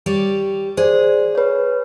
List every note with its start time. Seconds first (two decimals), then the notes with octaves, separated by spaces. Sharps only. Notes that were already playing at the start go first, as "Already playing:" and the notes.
0.06 G3 C#5 D5
0.77 G#4 C5 D5
1.35 B4 C#5